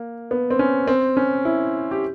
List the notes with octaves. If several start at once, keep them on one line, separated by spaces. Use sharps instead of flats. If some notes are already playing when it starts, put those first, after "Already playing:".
Already playing: A#3
B3
C4
C#4
C4
C#4
E4
G4